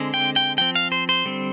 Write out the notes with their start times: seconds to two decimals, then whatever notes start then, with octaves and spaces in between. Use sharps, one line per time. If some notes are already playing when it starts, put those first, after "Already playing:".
Already playing: D3 G#3 C4
0.14 G5
0.36 G5
0.58 F3 C4 G5
0.75 F5
0.92 C5
1.09 C5
1.25 D3 G3 C4